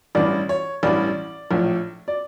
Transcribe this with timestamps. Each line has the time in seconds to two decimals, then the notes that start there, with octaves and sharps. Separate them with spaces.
0.15 A1 G2 E3 D5
0.49 C#5
0.83 A1 G2 E3 D5
1.51 A#1 A2 F3
2.08 D5